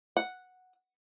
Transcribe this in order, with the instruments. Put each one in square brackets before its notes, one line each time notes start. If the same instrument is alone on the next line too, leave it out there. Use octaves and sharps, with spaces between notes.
[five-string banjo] F#5